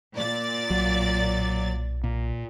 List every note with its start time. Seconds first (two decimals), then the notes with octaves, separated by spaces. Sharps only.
0.16 A#2 D5 A6
0.70 B1 F#3
2.04 A#2